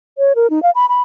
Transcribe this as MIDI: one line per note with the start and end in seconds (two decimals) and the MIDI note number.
0.18 0.33 73
0.36 0.50 70
0.50 0.62 63
0.63 0.70 77
0.75 0.86 83
0.89 1.02 83